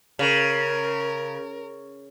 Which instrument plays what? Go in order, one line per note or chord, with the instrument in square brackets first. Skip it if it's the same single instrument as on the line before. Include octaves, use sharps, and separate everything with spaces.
[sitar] C#3 [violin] A#4